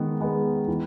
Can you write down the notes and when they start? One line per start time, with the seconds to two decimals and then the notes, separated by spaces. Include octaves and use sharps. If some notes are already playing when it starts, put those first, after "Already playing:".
Already playing: D#3 G#3 B3
0.20 G#3 B3
0.68 E3